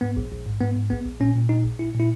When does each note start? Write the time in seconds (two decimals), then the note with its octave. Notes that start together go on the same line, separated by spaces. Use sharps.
0.01 G#2 B3
0.17 A#1
0.31 A#1
0.46 G#2
0.60 G#2 B3
0.76 G#2
0.90 A#1 B3
1.05 A#1
1.20 A#2 C#4
1.35 A#2
1.49 A#2 D#4
1.64 A#1
1.79 A#2 E4
1.94 A#2
2.00 E4